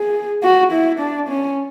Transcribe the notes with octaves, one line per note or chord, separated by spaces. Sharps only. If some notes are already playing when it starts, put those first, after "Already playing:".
Already playing: G#4
F#4
E4
D4
C#4